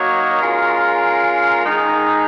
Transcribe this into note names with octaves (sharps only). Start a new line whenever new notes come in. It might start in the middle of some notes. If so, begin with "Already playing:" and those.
Already playing: F#3 A#3 D#4 A#4 C#5
G#3 C#4 F4 A#4
D#3 G#3 D#4